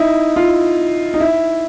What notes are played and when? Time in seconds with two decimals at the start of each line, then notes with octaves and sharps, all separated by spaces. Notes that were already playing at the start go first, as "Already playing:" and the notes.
Already playing: D#4 E4
0.36 F4
1.14 D#4
1.20 E4